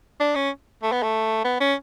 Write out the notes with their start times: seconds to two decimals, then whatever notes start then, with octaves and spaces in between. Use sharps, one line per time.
0.20 D4
0.35 C#4
0.83 A3
0.92 B3
1.02 A3
1.44 B3
1.60 C#4